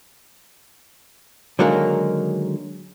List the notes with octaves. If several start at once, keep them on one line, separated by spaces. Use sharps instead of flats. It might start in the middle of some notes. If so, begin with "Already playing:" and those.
D3 D#3 F#3 G#3 A#3